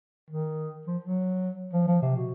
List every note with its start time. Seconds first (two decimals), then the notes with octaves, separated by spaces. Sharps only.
0.30 D#3
0.87 F3
1.02 F#3
1.73 F3
1.88 F3
2.02 C3
2.16 B2